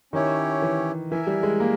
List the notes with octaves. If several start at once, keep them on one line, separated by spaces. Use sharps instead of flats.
D#3 C#4 E4 G4 C#5
E3
E3 E4 A#4 E5 G#5
G3
G#3
A#3